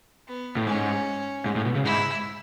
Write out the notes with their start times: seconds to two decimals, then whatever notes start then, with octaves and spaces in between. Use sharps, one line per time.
0.27 B3
0.57 A2
0.67 G#2 C#4
1.46 G#2
1.56 A2
1.65 B2
1.75 C#3
1.85 G#2 E4